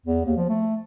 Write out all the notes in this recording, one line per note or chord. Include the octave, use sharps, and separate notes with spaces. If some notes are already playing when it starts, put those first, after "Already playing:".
E2
D#2
F3
A3